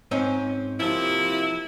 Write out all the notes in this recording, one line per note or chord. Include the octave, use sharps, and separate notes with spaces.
G#2 C4 C#4
C3 F3 A#3 E4